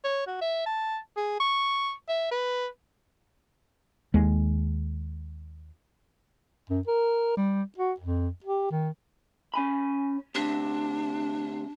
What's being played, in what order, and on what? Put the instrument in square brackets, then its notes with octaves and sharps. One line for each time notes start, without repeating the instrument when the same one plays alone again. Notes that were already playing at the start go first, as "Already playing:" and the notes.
[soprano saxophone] C#5
F#4
E5
A5
G#4
C#6
E5
B4
[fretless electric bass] D#2 G#3
[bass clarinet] F#2
A#4
G3
F#4
F2
G4
D#3
[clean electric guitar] C#4 G#5 B5
[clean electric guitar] D2 C3 [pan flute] D4